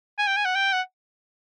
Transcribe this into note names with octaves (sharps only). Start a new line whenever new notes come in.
G#5
G5
G#5
F#5
G5
F#5